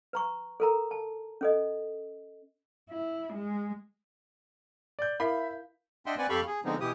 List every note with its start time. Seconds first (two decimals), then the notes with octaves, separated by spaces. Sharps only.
0.13 B4 A#5 C#6
0.60 A4 A#4 A#5
0.91 A5
1.41 C#4 A4 D#5
2.90 E4
3.33 G#3
4.99 D5 G6
5.20 E4 A#4 E5 F5 B5 B6
6.06 D4 D#5 E5 F#5 G5 C6
6.18 C4 B4 D5 F#5 G#5
6.29 F2 G4 A4 F5 B5 C#6
6.47 G#4
6.65 D3 F3 G#3 B3 C4 D#4
6.80 B2 E3 E4 G4 D#6